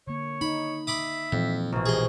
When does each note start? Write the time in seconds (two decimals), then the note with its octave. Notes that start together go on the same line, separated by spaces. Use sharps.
0.07 D3 A#3 C#5
0.41 D#4 B5
0.87 E5 B5 D6 D#6
1.32 F2 A#2 E3 G#3
1.72 A#1 B2 F5
1.86 E3 G4 G#4 D#5